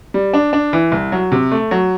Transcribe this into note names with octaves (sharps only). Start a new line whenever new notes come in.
G3
D4
D4
E3
C2
F#3
C3
A3
F#3